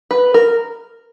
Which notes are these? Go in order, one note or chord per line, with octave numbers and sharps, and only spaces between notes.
B4
A#4